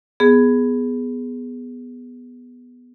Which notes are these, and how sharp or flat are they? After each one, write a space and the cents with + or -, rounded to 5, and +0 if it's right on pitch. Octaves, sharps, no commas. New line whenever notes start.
B3 +0 G#4 +0